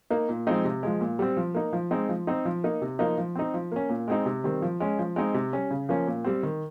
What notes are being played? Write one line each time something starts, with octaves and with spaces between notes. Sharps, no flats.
A#3 D#4
A#2
F3 G#3 C4 D#4
C3
F3 G#3
A#2
G3 C4
F3
A#3 D#4
F3
G#3 C4 D#4
F3
C4 D#4
F3
A#3 D#4
C3
F3 A#3 D#4
F3
C4 D#4
F3
A#3 C#4
A#2
G#3 C4 D#4
C3
D#3 G3 C4
F3
G#3 C#4
F3
G#3 C4 D#4
C3
G3 C#4
C#3
F3 A#3 C#4
A#2
G3 C4
D#3